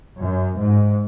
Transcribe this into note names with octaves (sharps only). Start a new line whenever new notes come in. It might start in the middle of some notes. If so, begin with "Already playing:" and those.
F#2
G#2